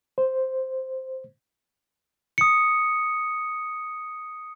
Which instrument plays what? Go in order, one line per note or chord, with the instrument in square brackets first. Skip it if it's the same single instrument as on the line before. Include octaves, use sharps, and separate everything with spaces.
[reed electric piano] C5
[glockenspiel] D#6 C#7